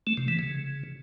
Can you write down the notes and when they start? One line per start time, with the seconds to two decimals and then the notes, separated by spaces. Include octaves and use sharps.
0.07 A3
0.17 C3
0.28 E3
0.39 C#3